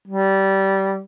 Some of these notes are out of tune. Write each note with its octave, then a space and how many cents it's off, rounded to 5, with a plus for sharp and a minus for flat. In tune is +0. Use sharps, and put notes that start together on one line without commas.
G3 -20